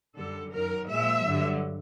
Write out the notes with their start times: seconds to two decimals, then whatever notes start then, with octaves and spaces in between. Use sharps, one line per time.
0.16 F#2 D3 G3 A4
0.53 F#2 D#3 F#3 A#4
0.88 A#2 F3 G#3 E5
1.24 G2 D3 F#3